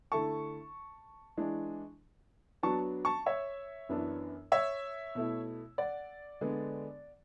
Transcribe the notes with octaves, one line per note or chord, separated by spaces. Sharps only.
D3 A3 E4 A4 A5 C#6
E3 G#3 D4
F#3 B3 D4 F#4 A5 C#6
A5 C#6
C#5 E5
F#2 E3 B3 D4
C#5 E5
B2 A3 E4
D5 F#5
D3 G#3 B3